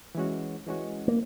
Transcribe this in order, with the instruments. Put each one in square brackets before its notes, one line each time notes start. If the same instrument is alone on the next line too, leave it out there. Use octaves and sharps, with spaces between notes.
[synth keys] E3 G#3 C#4 F#4
E3 G#3 C#4 F#4
[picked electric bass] A#3